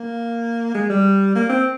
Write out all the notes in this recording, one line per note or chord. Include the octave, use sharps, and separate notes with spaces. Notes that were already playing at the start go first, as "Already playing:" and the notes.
Already playing: A#3
G#3
G3
A#3
C4